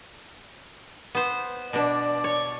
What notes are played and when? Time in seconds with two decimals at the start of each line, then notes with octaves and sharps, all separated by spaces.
1.15 B3 C5
1.73 B2 D4 D5
2.24 C#5